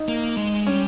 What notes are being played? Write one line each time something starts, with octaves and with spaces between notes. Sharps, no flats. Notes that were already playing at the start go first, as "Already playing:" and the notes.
Already playing: D#4
A#3
G#3
G3 C#4